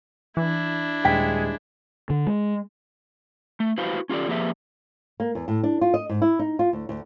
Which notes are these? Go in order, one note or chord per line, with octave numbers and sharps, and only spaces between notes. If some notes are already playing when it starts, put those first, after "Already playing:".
E3 D4 E4
D#1 G#3 G5 B6
D3
G#3
A3
E4 F#4 G4 B4 C5 F5
C#4 F4 G4 A4 D5
F3 A#3 G4 G#4 B4 E5
A#3
E2
A2
D4
F4
D#5
G#2
E4
D#4
F4
D2
D2